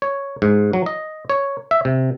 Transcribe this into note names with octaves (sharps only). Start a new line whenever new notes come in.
C#5
G#2
F#3
D#5
C#5
E5
C3